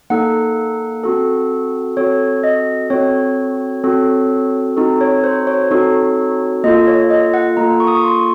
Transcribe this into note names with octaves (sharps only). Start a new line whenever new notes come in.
A#3 D#4 A4 F#5
C4 F#4 A4
C4 F#4 A4 C#5
D#5
C4 F#4 A4 C#5
C4 F#4 A4
C4 D#4 F#4 A4
C#5
C5
C#5
C4 D#4 F#4 A4
A#3 F4 A4 D#5
C#5
D#5
F#5
A#3 F4 A4 A#5
C#6
D#6
C#6
C6